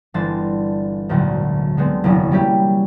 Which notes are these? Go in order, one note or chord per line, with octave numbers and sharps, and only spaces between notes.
G1 E3 D4 A4 C5 A6
G#1 D2 A#2 D3 F#3
D3 G#3 A3 B3 C4
F#1 E2 C3 F#3 G#3 C#4
F#3 G3 A#3 C#4 E4 G4